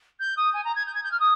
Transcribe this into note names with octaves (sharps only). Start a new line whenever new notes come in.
G6
D#6
G#5
A#5
G#6
G6
G#6
G6
F6
D#6